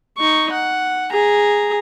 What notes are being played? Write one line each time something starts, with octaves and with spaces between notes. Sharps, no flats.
D#4 C#6
F#5
G#4 A#5